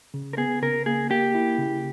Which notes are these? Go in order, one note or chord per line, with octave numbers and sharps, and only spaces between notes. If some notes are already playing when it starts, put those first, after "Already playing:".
C#3
A#4
B3 G#4
C#3 A#4
A#3 G#4
A#3 G4
E4
C#3